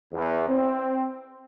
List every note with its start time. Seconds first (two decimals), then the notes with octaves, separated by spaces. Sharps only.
0.13 E2
0.48 C4